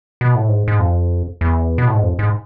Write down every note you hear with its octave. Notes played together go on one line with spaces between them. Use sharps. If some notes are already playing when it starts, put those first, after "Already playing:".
B2
A2
G#2
G#2
F2
E2
B2
A2
G#2
F2
G#2